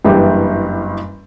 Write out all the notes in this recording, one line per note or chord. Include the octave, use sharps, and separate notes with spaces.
F#1 G2 E3 G3 G4